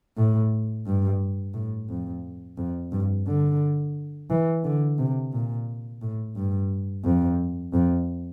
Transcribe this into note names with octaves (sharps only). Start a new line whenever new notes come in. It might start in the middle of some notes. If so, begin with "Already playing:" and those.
A2
G2
A2
F2
F2
G2
D3
E3
D3
C3
A#2
A2
G2
F2
F2